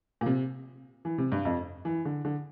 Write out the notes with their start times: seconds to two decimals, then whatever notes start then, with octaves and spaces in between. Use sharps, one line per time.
0.21 A#2
0.26 C3
1.05 E3
1.18 C3
1.32 G2
1.45 F2
1.85 E3
2.05 D3
2.25 D3